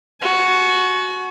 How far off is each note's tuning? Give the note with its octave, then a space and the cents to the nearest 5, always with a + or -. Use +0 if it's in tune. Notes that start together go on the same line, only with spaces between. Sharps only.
F#4 +0 G#5 +45